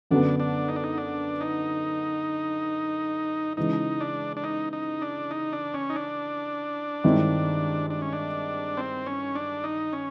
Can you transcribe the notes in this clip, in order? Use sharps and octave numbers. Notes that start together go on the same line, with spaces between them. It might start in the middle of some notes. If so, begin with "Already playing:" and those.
F#2 D3 F#3 B3 D4
D4
D#4
D4
D#4
D4
D#4
C#3 E3 G#3 D#4
D4
D4
D#4
D#4
D4
D#4
D4
C#4
D#4
D4
G2 D#3 G#3 C4 E4
D4
C#4
D4
C4
C#4
D4
D#4
C#4